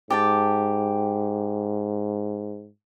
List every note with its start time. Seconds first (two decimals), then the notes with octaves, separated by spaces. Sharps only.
0.10 G#2 G4 G5 A5